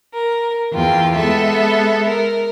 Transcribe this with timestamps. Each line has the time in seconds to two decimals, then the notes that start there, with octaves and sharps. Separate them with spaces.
0.15 A#4
0.72 E2 F4 G5
1.15 G#3 B3 A4 E5
2.06 A#4